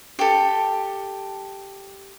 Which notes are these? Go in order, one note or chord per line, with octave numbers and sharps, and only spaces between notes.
G4 A4